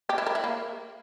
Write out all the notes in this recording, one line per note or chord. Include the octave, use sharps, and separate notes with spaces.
G4
E4
A#4
E4
A#3